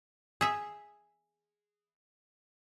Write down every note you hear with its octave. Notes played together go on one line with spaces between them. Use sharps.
G#4 E5